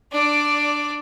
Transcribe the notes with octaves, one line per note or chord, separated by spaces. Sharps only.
D4 D5